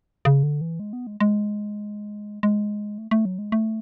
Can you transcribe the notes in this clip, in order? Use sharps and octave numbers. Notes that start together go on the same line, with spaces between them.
C#3
D3
E3
G#3
B3
G#3
G#3
G#3
A3
A3
F#3
G#3
A3